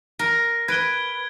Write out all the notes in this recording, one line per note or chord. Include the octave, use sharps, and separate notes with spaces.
A#4
B4 G#6 D7 G7